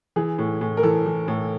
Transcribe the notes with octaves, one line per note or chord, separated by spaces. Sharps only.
E3 G#4
A2
A2
A#4
E3 A4
E3
A2